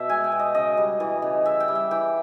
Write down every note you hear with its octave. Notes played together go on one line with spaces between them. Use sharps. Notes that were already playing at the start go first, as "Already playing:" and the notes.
Already playing: B2 E5
G#3 G#5
G5
B2
D#5
C#3 D#5
G3
E3
C#3
C#3 E5
G5
G3
E5
E3 G5